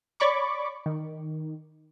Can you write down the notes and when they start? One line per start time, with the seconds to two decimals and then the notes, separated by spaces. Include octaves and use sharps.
0.20 C#5 D5 B5 C#6 D6
0.86 D#3